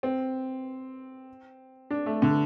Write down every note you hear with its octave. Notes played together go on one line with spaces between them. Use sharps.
C4
D4
A3
D3